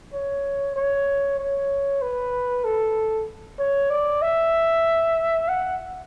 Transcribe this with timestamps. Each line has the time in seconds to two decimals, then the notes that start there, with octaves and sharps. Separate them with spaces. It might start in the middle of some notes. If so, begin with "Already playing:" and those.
0.13 C#5
0.76 C#5
1.39 C#5
2.02 B4
2.64 A4
3.59 C#5
3.90 D5
4.22 E5
5.48 F#5